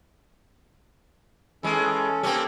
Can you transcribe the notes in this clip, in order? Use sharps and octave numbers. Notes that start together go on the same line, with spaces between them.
E3 G#3 C#4 A4
A#3 C4 C#4 G4 A4